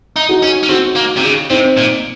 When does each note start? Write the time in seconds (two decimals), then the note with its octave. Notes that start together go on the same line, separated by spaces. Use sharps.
0.16 D#4
0.29 D#4 F#4
0.42 C#4
0.63 C#4
0.69 C4 D#4 F#4
0.96 A#3
1.17 C3
1.23 C#3
1.50 C3 C4 D#4
1.77 A#2